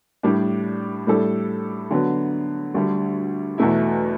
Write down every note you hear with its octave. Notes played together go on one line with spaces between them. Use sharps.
A2 G3 D4
A2 G3 D4 A4
D3 F#3 B3
D2 D3 G3
E2 B2 A3 E4